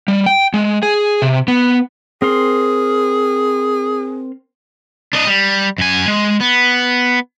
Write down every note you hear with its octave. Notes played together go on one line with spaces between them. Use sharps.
G3
G5
G#3
G#4
C3
B3
C4 G#4 A#4 C6
D4 D#5
G3
F#2 G#5
G#3
B3